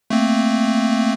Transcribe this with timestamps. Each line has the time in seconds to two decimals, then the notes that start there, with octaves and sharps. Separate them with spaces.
0.10 A3 A#3 C4